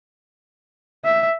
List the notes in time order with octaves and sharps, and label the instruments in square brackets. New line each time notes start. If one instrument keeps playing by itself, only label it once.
[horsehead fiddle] E5